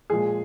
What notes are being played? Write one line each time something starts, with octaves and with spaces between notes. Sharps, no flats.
A#2 F3 G#3 G#4